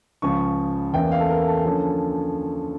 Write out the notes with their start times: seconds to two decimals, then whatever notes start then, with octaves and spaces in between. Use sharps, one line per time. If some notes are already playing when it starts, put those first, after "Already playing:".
0.22 C#2 C#3 F3 C#6
0.93 E2 E3 A#3 C#4 G5
1.12 F5
1.20 A4
1.30 A#4
1.47 A4
1.65 D3 F3 A#3 C#4